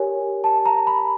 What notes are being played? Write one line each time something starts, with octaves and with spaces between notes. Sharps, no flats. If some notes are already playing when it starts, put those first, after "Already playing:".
Already playing: G4 A#4 C#5 G#5
A5
A#5
B5